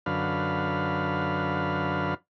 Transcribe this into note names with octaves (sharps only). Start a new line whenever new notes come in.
F#2 D3 B4 F5